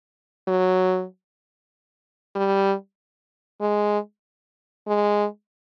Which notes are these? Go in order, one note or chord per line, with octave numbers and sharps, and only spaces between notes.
F#3
G3
G#3
G#3